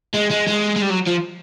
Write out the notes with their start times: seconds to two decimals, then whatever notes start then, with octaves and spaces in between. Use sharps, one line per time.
0.14 G#3
0.30 G#3
0.47 G#3
0.76 G#3
0.82 G3
0.90 F#3
1.07 F3